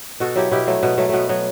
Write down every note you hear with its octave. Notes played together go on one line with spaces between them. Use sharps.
B2 F#4 A4
F#3 E4 G4
B2 E4 G4
F#3 A3
B2 B3
F#3 A3
B2 A3 B3
F#3 B3